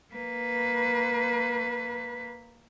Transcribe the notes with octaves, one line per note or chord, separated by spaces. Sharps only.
A#3 B4